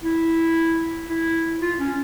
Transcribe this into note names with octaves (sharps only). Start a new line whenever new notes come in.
E4
E4
F4
C#4